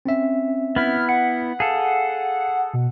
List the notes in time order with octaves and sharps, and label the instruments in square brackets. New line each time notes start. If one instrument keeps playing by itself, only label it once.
[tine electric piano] C4 C#4 E5
[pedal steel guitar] B3 E4 [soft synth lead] F6
[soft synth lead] F#5 [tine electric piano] C#7
[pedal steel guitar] G#4 A4 [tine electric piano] F5
[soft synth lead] B2